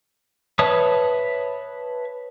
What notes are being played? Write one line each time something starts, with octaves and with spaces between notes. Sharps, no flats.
B4 C#5 E5 A5 D#6